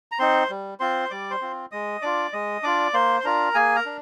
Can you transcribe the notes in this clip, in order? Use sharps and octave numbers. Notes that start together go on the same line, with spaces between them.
A#5
C4 D#4 C5 C6
G3
C4 F4 C5 C6
G3 D5 D6
C5 C6
C4 F4
G#3 D#5 D#6
D4 F4 D5 D6
G#3 D#5 D#6
D4 F4 D5 D6
A#3 C5 C6
C6
D4 F4 A#4 A#5
A#3 G#4 G#5
A#4 A#5
D4